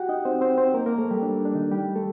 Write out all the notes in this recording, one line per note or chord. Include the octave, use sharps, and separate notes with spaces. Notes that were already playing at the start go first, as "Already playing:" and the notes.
Already playing: F#4 G4 F#5 G5
D#4 D#5
C4 C5
C4 C5
C4 C5
A#3 A#4
A#3 A#4
A3 A4
G3 G4
D4
D4
D#3 D#4
G3 G4
A3 A4